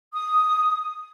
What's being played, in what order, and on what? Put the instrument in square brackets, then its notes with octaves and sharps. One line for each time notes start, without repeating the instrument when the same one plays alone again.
[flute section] D#6